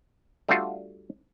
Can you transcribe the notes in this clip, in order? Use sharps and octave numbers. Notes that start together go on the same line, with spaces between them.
G3 A3 D4 F4 F#4